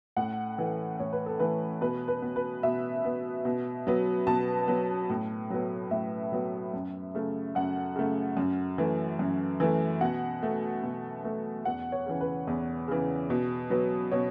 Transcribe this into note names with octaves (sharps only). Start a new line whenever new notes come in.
A2 F#5
E3 A3
A2 C#5
B4
A4
E3 A3 B4
B2 B4
B4
B3
B4
B2 E5
B3
B2
F#3 B3
B2 A5
F#3 B3
A2
F#3 B3
A2 E5
F#3 B3
F#2
C#3 A3
F#2 F#5
C#3 A3
F#2
E3 A3
F#2
E3 A3
B2 F#5
A3
B2
A3
E2 F#5
C#5
C#3 E3
B4
E2
C#3 E3
B2
F#3 B3
B2 C#5